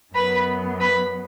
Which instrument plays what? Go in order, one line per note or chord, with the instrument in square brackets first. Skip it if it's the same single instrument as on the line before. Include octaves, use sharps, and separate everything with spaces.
[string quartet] F#2 F#3 B3 B4 B5
B4 B5